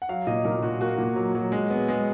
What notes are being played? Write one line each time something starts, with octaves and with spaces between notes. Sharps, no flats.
F#5
F#3 F5
A#2 D#5
A#2 A#4
A#2 F#4
A#3 F#4
A#2
F#3
F#3
G#3
B3
G#3